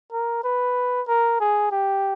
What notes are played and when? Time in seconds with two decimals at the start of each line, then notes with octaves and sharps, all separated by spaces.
0.13 A#4
0.44 B4
1.08 A#4
1.40 G#4
1.72 G4